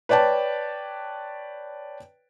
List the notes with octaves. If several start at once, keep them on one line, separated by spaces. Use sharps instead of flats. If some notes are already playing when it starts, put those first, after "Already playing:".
B4 C#5 D5 G5 A5